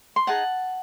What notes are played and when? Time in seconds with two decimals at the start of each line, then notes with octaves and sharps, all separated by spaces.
0.16 C6
0.27 D#4 G#4 D#5 F#5 A5